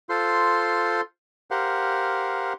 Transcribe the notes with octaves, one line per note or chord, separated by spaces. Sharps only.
F4 A4 C5 C6
G4 A#4 C5 F5 F#5